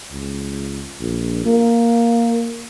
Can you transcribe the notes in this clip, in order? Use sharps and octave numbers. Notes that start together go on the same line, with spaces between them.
C#2
A#1
A#3